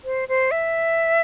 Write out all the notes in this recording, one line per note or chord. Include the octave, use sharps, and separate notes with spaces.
C5
C5
E5